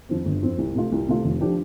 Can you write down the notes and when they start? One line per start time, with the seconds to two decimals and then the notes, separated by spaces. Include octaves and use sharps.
0.09 F2 F3 C4
0.25 G1
0.42 F2 F3 C4
0.58 C2
0.75 C3 A3 F4
0.92 C2
1.08 C3 A3 F4
1.24 F1
1.41 F3 D4 G4